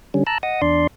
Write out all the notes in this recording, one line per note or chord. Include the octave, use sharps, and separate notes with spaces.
D3 G3 C#4
A5 A#5 E6 F#6
D#5 F#5 D#6
E2 D4 D5 C6